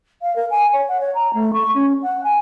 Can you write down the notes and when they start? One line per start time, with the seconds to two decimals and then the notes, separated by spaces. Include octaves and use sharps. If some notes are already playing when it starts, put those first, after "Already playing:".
0.22 F5
0.36 A#4
0.51 G#5
0.73 C#5
0.89 F#5
1.01 C#5
1.15 A#5
1.34 A3
1.53 C#6
1.74 C#4
2.03 F#5
2.24 G#5